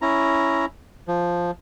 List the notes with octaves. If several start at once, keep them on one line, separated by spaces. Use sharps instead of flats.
C#4 E4 A#5
F3